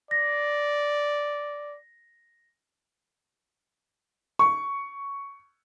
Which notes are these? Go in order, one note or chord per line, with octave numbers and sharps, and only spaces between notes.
D5 A#6
C#6